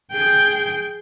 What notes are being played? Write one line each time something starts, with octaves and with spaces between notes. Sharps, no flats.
G#4 G5